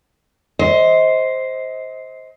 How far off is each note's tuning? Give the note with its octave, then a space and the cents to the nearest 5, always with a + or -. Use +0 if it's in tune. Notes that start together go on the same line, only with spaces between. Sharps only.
C5 +0 D#5 +30